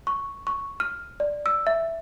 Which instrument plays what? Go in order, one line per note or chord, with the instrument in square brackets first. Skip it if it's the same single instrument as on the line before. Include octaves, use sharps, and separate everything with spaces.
[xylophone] C#6
C#6
F6
D5
E6
E5